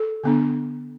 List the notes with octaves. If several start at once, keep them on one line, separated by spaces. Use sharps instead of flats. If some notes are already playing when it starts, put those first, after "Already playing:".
Already playing: A4
D3 B3 D4